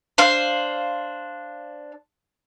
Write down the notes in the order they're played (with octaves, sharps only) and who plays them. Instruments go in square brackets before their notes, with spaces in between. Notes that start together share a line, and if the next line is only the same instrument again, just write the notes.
[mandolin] D4 C5 F5